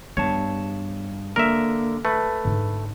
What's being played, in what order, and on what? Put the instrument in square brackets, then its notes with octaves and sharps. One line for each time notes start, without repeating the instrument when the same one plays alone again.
[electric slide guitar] G2 A5 [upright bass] B3 [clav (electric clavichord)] C#5
[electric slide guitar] D3 A#3 [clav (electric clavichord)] A#4 E5
[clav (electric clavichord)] A3 [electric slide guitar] B4
[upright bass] G#2 D3